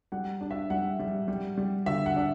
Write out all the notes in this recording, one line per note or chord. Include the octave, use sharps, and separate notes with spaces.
G3 F#5
D4
E5
G3 F#5
G3
G3
G3
D3 E5
F#5
D4